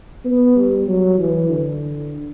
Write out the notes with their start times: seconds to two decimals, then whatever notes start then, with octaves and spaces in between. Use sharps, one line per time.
0.25 B3
0.56 G3
0.87 F#3
1.18 E3
1.49 D3